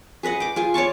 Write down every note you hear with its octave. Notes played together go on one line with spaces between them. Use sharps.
G#4 B4 D#5 F#5
G5 D6
F4 G#4 G#5
C#5 D5 A5 C#6